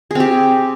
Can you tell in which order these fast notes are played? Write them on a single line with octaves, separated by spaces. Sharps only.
G#4 C4 G4